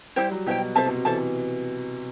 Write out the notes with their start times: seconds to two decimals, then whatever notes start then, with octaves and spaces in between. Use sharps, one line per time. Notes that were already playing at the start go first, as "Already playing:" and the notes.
0.16 G3 E4 G4 C5 G5
0.31 F#3
0.46 B2 E4 G4 C5 G5
0.75 C3 A4 C5 E5 A5
0.86 B2
0.95 C3
1.05 E3 A4 C5 E5 A5